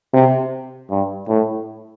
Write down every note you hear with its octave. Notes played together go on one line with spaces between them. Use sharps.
C3
G2
A2